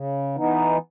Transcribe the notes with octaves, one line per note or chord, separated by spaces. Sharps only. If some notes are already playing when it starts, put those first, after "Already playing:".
Already playing: C#3
E3 B3 D#4